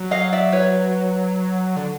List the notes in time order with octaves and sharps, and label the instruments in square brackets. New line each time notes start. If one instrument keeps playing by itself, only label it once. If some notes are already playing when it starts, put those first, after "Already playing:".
Already playing: [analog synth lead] F#3
[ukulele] D#5 F5
D5 E5
B4 C#5
[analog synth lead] D3